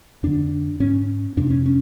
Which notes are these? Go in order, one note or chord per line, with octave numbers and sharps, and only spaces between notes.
F2 D3 D4
G#2 C#4
F2 C3 D4
C#4
C#4